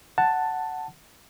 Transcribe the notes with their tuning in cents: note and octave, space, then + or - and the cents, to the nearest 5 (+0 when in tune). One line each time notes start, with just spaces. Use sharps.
F#5 +5 A5 +5